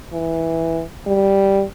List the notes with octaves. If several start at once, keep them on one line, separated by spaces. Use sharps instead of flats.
E3
G3